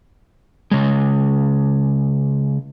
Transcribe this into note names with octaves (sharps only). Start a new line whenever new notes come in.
C#3 G#3